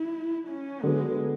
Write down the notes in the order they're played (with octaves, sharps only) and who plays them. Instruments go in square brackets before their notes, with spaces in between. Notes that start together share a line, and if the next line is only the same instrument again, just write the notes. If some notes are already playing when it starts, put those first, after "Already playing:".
Already playing: [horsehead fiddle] E4
C#4
[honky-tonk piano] D3 F#3 B3 [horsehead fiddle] G#3